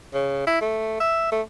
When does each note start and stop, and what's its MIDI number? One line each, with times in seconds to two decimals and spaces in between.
0.14 0.43 49
0.47 0.60 64
0.61 0.95 57
1.00 1.29 76
1.32 1.42 57